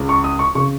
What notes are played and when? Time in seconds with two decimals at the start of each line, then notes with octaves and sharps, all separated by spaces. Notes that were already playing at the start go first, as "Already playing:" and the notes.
Already playing: C#2 C#3
0.09 C#6
0.24 D#6
0.39 C#6
0.55 C#3 C#6